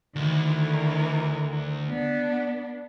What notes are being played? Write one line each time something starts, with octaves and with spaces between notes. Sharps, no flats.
D2 D#3 E3 A#4
B3 D4